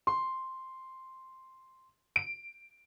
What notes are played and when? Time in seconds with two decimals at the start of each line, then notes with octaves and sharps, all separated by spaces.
0.07 C6
2.16 D7